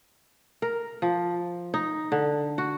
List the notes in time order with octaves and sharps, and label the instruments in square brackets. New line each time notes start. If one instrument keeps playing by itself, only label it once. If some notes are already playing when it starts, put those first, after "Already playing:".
[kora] A#4
F3
D#4
D3
F#4